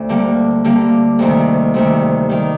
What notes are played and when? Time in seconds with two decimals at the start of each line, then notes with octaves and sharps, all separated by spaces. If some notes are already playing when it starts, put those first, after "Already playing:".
Already playing: D2 C4
0.09 D3 G3 A#3
0.64 D3 G3 A#3
1.19 D2 C3 D#3
1.74 D2 C3 D#3
2.29 D#3 G3